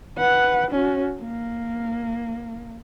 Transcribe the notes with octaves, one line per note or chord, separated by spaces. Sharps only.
B4 F#5
C#4 F#4
A#3